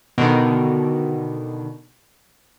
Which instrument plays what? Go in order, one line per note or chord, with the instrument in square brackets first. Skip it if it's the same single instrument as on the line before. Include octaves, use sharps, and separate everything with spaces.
[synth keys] B2 D3 D#3